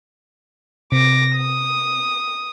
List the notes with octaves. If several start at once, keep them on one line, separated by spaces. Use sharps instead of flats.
C3 D6 A#6
D#6